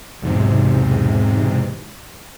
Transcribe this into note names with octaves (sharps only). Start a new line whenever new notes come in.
B1 E2 G#2 C3